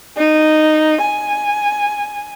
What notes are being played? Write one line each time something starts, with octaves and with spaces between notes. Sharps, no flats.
D#4
G#5